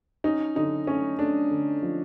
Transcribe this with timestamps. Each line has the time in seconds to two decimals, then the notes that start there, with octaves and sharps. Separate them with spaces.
0.24 C#4 D#4
0.56 D3 D#4
0.87 A3 C#4
1.19 A3 D4
1.51 D3
1.82 F3